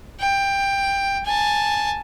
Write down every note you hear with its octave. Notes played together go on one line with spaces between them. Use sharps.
G5
G#5 A5